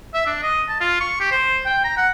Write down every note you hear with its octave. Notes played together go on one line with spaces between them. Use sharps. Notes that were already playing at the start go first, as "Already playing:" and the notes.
E5
D4
D#5
A5
F4
C#6
G4
C5
G5
A#5
F#5